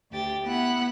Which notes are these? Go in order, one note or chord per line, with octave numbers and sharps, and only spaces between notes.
D2 G4 A6
B3 E4 F#5